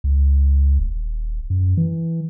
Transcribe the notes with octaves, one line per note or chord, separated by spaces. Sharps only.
C#2
D#1
F#2
E3